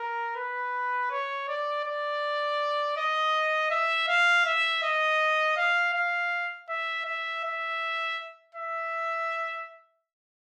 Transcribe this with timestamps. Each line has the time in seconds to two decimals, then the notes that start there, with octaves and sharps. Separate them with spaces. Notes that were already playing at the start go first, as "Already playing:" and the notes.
Already playing: A#4
0.36 B4
1.11 C#5
1.48 D5
1.84 D5
2.97 D#5
3.71 E5
4.08 F5
4.45 E5
4.83 D#5
5.57 F5
5.94 F5
6.69 E5
7.06 E5
7.44 E5
8.55 E5